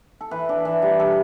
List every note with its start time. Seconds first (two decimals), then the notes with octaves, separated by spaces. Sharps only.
0.21 A4
0.31 E3 B4
0.49 D4
0.65 E3
0.82 G3
0.99 D4 A4